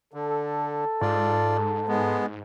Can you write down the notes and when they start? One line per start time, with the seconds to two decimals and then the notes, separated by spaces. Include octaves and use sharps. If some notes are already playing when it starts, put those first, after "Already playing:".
0.14 D3 A4
1.01 G#2 F4 D5
1.88 G#3 B3